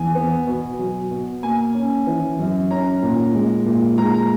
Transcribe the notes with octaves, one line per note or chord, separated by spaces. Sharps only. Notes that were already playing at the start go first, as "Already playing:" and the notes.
Already playing: E2 G#5
B3
B2
F#3
B2
A#3 G#5
C#4
E3
F#2
C#4 A#5
A#2
G#3
A#2
G#3 A#5
A#5